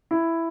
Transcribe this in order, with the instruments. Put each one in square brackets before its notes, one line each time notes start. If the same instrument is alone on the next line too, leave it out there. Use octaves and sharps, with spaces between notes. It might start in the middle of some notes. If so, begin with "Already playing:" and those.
[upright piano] E4